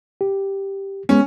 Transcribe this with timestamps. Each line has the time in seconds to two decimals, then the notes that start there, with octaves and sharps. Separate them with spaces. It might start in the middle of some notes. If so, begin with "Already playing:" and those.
0.21 G4
1.09 G#3 B3 C#4